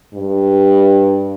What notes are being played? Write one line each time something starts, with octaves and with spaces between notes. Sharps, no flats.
G2